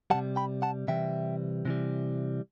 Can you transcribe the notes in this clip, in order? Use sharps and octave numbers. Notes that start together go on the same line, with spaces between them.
C3 E3 G3 F#5 A5
G5 B5
F#5 A5
C3 E3 G3 E5 G5
C3 E3 G3